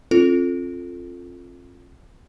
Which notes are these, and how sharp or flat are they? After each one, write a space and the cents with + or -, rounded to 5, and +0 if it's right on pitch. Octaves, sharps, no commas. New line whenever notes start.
C4 +45 F4 +0 A4 +0